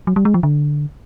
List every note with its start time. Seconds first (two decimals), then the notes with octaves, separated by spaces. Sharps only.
0.07 F#3
0.16 G3
0.25 G#3
0.34 F3
0.43 D3